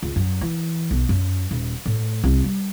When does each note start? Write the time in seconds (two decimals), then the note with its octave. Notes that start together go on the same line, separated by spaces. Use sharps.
0.03 C#2
0.16 F#2
0.41 E3
0.91 B1
1.09 F#2
1.51 D#1
1.86 A2
2.24 C2
2.44 G3